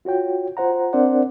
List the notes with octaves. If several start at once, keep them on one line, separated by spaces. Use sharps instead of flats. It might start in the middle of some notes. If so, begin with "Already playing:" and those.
F4 F#4 C#5 G5
F4 C5 F#5 A#5
C4 D4 A#4 C5 D5 F#5